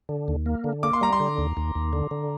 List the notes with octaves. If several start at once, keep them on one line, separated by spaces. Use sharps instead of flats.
D3
D#2
A#3
D3
A#3 D6
C6
G3 A#5
C6
D3
D#2
D#2
D#2
D3
D3